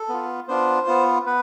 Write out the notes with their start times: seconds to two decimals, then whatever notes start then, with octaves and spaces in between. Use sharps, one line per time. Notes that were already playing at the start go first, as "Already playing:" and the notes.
Already playing: A4
0.09 B3 F4
0.48 B3 D4 F4 C5
0.87 B3 F4
1.26 B3 B4